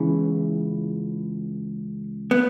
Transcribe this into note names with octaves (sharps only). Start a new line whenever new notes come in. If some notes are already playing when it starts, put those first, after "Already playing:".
Already playing: C#2 C#3 E3 B3
B3